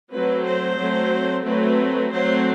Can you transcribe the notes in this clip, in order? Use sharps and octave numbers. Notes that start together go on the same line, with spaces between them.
F#3 A3 C4 B4
C5
F#3 A3 C4
F#3 A3 C4 B4
F#3 A3 C4 C5